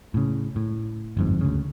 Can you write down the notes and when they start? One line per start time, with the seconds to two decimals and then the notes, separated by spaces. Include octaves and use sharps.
0.14 A2 C#3
0.56 A2
1.17 G1 F2 G#2
1.41 D2 C#3